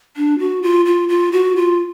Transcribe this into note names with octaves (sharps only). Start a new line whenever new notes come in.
D4
F#4
F4
F4
F4
F#4
F4